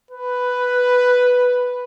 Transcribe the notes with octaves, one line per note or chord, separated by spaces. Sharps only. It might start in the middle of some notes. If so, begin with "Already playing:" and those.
B4